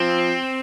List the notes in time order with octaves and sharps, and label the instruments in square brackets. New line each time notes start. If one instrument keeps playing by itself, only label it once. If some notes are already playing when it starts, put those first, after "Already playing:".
Already playing: [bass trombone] F3 [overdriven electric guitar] C4